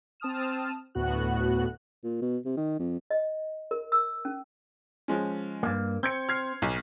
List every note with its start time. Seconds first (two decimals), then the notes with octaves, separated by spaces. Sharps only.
0.20 C4 A5 D#6 F6 E7
0.95 D2 A2 B3 F#4 F#6
2.04 A#2
2.22 B2
2.45 C3
2.57 D#3
2.79 F2
3.10 D#5
3.71 A#4
3.92 E6
4.25 C#4
5.08 F3 G#3 C#4
5.63 G2 A#3
6.03 C4 G6 G#6 C#7
6.29 F6 G#6 C7
6.62 B1